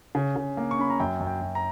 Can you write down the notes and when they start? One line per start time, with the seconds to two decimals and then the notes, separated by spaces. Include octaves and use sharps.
0.15 C#3
0.36 C#3
0.57 A#3
0.71 C#6
0.79 C#4 B5
0.90 A#5
1.00 F#2 G5
1.20 F#2
1.27 G5
1.41 F#2
1.55 A#5